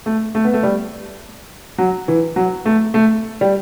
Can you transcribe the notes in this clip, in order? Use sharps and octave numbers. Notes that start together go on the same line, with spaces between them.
A3
A3
B3
A3
G3
F#3
E3
F#3
A3
A3
G3